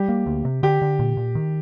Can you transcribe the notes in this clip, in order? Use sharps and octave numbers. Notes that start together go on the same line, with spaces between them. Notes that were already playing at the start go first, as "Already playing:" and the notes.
Already playing: G3 G4
A#3
D2
C3
D3 G4
D3
A#2
A#2
D#3